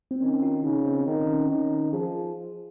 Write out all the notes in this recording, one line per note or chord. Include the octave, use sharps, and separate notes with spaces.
C4
D#3 C#4
F4
C#3 D#4
C4
D#3 C#4
C4
C#4
D#3 D#4
F3 G#4